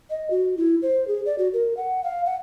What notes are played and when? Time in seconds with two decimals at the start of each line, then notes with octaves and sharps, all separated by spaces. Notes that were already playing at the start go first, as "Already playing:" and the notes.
0.10 D#5
0.30 F#4
0.57 E4
0.82 C5
1.07 G#4
1.26 D5
1.38 F#4
1.53 A#4
1.77 F#5
2.04 F5
2.25 F#5